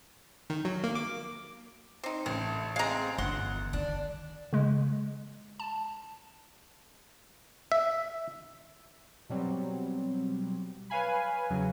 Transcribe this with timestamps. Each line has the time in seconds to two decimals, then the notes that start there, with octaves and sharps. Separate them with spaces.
0.50 D#3
0.65 F#3
0.84 A#3
0.95 D6
2.04 C4 D#4
2.26 A1 A3
2.76 G#3 C4 F5 A#5
3.18 G1 F#5 C6
3.73 D3 D#3 D4
4.53 C#3 G#3
5.60 A5
7.72 E5
9.29 B2 F#3 G3 C4
10.90 B4 C#5 F5 G#5 B5
11.50 E2 C#3 F#3